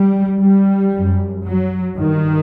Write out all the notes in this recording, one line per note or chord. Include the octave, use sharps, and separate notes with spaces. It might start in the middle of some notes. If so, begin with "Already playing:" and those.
Already playing: G3
G3
F#2
F#3
G2 D#3